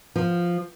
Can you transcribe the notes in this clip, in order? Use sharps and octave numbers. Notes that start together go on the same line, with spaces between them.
F3